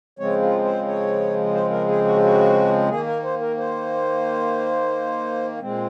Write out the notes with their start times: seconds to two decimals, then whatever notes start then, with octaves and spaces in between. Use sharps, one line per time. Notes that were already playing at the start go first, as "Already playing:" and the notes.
0.19 C#3 F3 G#3 C4 C#5
0.42 F4
0.64 C5
0.87 C#5
1.54 C5
1.71 A#4
1.88 G#4
2.05 F#4
2.16 F4
2.22 F#4
2.89 D#3 A#3 G#4
3.06 A#4
3.23 C5
3.41 A#4
3.57 C5
5.59 A#2 G#3 C4